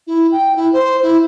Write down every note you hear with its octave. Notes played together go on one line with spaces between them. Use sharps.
E4
G5
E4
C5
E4